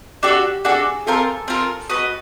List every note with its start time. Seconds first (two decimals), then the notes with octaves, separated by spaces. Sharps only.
0.23 D4 F#4 G4 A4
0.65 D4 F#4 G#4 A4
1.06 C4 F4 A4 A#4
1.48 C4 F4 A#4
1.90 F#4 B4 D#5